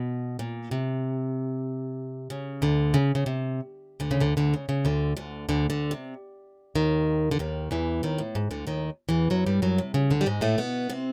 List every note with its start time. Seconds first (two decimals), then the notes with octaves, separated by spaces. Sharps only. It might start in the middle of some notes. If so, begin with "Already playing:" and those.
Already playing: B2
0.39 A#2
0.71 C3
2.30 C#3
2.62 D2 D3
2.94 C#3
3.15 C#3
3.26 C3
4.00 D2 D3
4.11 C#3
4.20 D2 D3
4.37 D2 D3
4.54 C#3
4.69 C#3
4.85 D2 D3
5.17 D2 D3
5.49 D2 D3
5.70 D2 D3
5.91 C3
6.75 D#2 D#3
7.31 D3
7.39 D#2 D#3
7.71 E2 E3
8.03 D#2 D#3
8.18 A2
8.35 G#2
8.51 D2 D3
8.67 D#2 D#3
9.09 E2 E3
9.30 F#2 F#3
9.46 G2 G3
9.62 F#2 F#3
9.78 C3
9.94 C#3
10.10 D2 D3
10.21 G3
10.26 G#2 G#3
10.41 A2 A3
10.58 B2 B3
10.90 C3 C4